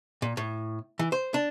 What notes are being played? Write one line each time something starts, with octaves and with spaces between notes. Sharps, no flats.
A#2
A2
E3
C5
D4